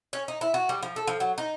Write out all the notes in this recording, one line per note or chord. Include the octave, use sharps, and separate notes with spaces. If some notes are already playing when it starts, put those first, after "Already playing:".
C#4
D#4
E4
F#4
G3
F3
A4
F3
F#3
D#4